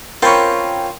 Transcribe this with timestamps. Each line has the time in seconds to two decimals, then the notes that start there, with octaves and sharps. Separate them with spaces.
0.22 C4 C#4 F4 A#4 G5 B5 C#6